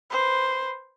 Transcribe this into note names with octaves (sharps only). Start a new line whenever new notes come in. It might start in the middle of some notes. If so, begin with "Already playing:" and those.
B4 C5